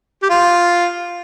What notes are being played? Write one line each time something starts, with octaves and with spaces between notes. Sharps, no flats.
G4
F4